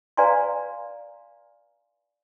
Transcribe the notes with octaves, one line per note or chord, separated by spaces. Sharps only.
B4 D5 F5 G#5 A#5 C6